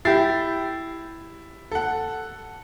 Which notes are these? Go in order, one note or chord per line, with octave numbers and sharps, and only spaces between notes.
E4 G4 A6 C7
A4 F#5